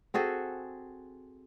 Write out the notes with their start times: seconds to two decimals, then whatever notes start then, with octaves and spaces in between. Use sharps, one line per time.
0.14 C4 F#4 G#4 A4